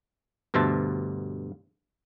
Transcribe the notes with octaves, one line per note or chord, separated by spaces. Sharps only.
D2 G2 B2 C5 E5 A5